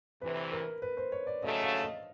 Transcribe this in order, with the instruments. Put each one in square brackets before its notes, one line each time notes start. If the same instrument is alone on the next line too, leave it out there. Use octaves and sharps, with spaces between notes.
[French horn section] D2 C3 E3 [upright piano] B4
[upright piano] A#4
B4
C5
C#5
D5
[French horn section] D#2 C#3 F#3 A3 [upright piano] D#5
[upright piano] F5
D#5